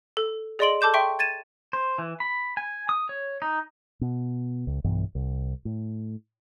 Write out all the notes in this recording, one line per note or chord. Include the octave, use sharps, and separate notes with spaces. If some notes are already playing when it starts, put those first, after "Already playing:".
A4
G#4 D5 D#5 C6 D7 F#7
A4 A5 D6 G6 E7
E5 G5 C6 C#6
G#6 A6 D#7 E7
C5
E3
B5
G#5
D#6
C#5
D#4
B2
C#2
B1 G2 E3 B3
C2
A2